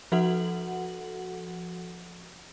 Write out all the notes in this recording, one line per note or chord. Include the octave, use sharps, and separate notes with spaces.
F3 F#4 A4 F#5 F#7